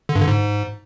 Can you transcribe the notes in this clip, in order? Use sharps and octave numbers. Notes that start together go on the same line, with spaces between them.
D3
G2
D3
G#2